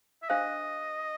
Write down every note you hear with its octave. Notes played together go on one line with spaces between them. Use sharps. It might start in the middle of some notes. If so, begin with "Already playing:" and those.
E5
D4 G4 C5 D#5 F5